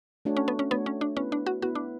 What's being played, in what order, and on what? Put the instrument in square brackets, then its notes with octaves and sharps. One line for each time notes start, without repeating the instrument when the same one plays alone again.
[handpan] A3 D4 F#4 C#5
[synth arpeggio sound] C#4
B3
C#4
[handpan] A3 D4 F#4 C#5 [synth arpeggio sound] B3
[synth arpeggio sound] C#4
D4
[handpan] B3 E4 B4 [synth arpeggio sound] C#4
[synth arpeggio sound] D4
F#4
[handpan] B3 E4 B4 [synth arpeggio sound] F#4
[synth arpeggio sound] D4